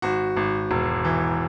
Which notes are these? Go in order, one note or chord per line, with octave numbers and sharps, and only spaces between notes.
G#1 F#4
G#1
E1
E3